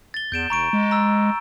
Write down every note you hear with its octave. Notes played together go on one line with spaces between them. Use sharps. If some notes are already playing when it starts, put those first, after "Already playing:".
A6 G7
E2 G6 D7 E7
E1 A#5 C#6 D7
G#3
A#5 E6